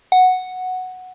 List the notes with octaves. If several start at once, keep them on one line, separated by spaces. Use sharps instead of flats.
F#5